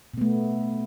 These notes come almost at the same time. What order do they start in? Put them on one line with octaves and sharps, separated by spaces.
B2 B3 A3